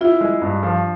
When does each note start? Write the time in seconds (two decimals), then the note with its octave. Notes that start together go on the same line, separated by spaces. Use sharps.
0.01 E4 F4
0.21 G#3
0.42 G2
0.63 F3